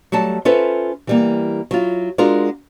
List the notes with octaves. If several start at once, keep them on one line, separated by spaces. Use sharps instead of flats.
F#3 G3 A3 A5
C#4 F4 A4 B4 C5 E5
E3 G3 A#3
F#3 E4 F4
G#3 D4 F4 F#4 A#4